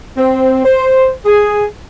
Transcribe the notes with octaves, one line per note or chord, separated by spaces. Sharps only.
C4
C5
G#4